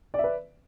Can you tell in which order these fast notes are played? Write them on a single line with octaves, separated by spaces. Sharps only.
D5 E5 B4